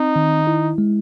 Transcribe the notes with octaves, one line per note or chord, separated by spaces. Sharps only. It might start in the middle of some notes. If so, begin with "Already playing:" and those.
Already playing: C4 D#4
D#3
E4
G#3